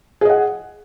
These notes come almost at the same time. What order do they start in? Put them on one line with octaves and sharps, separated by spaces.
G#4 D#5 F#5